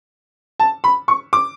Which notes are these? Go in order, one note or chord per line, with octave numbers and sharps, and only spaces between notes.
A5
B5
C#6
D6